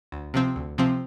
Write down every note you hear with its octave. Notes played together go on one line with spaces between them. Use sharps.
D2
C3 F3 C4
D2
C3 F3 C4